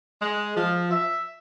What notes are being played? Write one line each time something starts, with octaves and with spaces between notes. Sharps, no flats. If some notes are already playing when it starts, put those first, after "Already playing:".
G#3
F3
E5